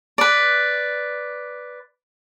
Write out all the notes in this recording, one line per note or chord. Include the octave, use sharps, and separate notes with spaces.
B4 D5